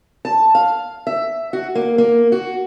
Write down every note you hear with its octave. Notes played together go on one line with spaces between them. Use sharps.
A5
F5
E5
F#4
A#3
A#3
F#4